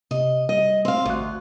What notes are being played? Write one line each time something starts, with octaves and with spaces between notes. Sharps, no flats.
C3 D#5
G3 D#5
C4 F5
A1 D2 F#6